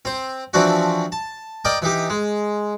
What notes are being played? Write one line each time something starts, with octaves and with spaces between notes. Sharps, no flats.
C4 C5
E3 F3 C4 D4 F#4
A5
A#4 D5 D#5 G5
E3 D#4 G4
G#3